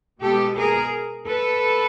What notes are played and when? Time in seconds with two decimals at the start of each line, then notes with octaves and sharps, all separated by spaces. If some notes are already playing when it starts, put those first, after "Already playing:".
0.22 B2 G#3 B3 G4 A4
0.58 G#4 A#4
1.27 A4 B4